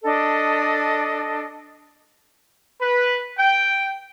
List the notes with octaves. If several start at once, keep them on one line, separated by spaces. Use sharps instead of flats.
D4 A4 D#5
B4
G5